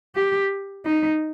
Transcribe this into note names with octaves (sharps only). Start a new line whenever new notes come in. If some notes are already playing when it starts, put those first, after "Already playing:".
G4
D#4